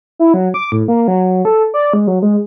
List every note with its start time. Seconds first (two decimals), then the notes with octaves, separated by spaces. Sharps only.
0.19 E4
0.34 F#3
0.54 D6
0.72 A2
0.88 A#3
1.08 F#3
1.45 A4
1.74 D5
1.94 G#3
2.07 F#3
2.22 G#3